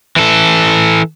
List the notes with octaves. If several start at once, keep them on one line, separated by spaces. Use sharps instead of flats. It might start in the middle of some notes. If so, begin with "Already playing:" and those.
E3 A4